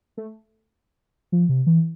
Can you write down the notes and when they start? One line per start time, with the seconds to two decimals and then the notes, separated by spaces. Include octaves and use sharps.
0.17 A3
1.32 F3
1.49 C3
1.67 E3